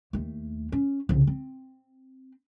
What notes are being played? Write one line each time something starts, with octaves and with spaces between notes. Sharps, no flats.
D#2 A3
C#4
C2 C#3
C4